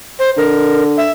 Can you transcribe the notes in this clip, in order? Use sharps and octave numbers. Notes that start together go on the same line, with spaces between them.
C5
D3 A#4
E5